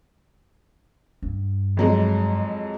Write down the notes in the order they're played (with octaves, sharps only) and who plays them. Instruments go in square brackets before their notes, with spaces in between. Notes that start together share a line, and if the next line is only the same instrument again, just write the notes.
[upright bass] G2
[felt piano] F2 F#3 G#3